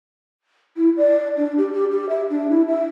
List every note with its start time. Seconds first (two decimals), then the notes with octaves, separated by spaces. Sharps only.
0.77 E4
0.97 D5
1.37 D4
1.58 G4
1.73 G4
1.91 G4
2.09 E5
2.30 D4
2.50 E4
2.68 E5